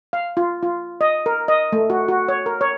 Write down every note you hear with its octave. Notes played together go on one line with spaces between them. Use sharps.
F5
F4
F4
D#5
A#4
D#5
A3
F#4
F#4
C#5
A#4
C#5